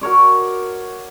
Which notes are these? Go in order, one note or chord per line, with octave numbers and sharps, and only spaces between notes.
F#4 A#4 C#5 D5